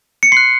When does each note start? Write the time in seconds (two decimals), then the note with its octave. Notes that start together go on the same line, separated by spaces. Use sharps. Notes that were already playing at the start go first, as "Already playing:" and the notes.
0.23 C#7
0.32 C6 F#6 C7